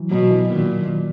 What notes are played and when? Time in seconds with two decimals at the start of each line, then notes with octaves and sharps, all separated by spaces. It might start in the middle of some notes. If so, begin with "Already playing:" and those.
Already playing: E3 F#3
0.11 B2 F#3
0.30 E3
0.50 A#2 D#3